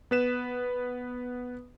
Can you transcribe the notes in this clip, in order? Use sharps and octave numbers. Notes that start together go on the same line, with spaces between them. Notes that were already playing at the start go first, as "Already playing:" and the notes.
B3 B4 E7